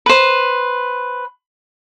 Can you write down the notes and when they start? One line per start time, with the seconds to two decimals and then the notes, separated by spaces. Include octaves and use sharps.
0.06 B4 C5